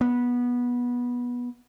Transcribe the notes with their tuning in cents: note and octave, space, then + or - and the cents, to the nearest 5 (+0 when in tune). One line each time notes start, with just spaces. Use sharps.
B3 -15